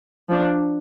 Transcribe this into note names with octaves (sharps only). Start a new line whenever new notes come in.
F3 D4